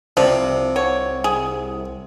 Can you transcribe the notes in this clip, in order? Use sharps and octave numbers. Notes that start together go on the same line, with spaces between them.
C2 C3 F3 D5 F#7
C#5 F#5
G#4